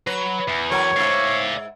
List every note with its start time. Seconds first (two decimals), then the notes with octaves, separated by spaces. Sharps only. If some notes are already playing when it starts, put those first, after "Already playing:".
0.07 F#3 B4
0.48 E2
0.71 F#3 A#4 C#5
0.96 G#2 D5 E5 F5